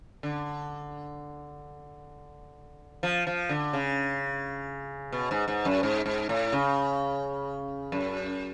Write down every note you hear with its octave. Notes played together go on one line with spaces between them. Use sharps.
D3
F3
F3
D3
C#3
B2
G#2
G#2
F#2
G#2
G#2
A2
C#3
F#2